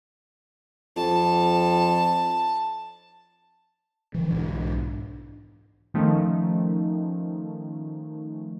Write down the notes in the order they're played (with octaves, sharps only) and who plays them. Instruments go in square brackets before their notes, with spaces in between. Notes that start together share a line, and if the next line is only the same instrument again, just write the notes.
[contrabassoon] F2 [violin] A5
[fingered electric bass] D3 E3
B1 G#2 E3 D4
[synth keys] D#3 F3 A3 C#4 D#4